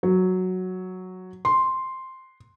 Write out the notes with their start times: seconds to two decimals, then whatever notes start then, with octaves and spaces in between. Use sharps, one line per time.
0.03 F#3
1.45 C6